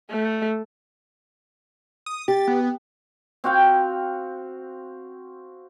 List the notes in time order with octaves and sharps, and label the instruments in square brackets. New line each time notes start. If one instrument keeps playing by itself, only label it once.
[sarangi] A3
[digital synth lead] D#6
[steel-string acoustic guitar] G4 [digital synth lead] A6
[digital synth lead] B3
[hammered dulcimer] C4 F#4 F5 G5